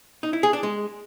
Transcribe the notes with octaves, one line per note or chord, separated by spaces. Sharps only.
D#4
E4
G#4
D4
G#3